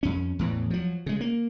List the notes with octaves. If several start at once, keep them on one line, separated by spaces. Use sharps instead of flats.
F2 C#4
E2 A2 E3
F3 F#3
C#3 G#3
A#3